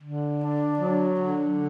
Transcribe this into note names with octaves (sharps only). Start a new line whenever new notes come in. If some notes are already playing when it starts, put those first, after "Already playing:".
D3
D4
F#3
D3